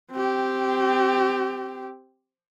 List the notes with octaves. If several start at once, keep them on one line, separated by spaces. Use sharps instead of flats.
C4 G4